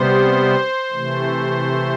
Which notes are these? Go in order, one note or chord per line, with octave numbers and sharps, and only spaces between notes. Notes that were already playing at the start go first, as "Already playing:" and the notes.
Already playing: C3 G3 B3 C5
C3 E3 A3